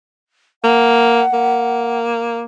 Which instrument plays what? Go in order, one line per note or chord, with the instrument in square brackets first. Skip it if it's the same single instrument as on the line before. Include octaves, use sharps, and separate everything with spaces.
[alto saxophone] A#3 [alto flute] F#5
[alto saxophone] A#3